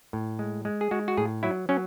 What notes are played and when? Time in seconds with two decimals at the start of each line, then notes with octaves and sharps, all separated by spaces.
0.13 A2
0.39 G#3
0.65 G#3
0.81 G#4
0.91 G#3 F#4
1.08 F#4
1.17 A2 G#4
1.43 F#3 E4
1.69 F#3 C#4